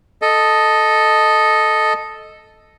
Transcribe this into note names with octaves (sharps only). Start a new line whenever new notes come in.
A4 D#5